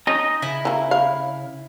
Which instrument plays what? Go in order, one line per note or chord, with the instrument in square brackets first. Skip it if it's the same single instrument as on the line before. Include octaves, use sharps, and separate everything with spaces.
[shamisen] C#4 [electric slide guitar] D#4 D#5
[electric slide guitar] C#3 [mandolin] E4
[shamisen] E3 A#3
F5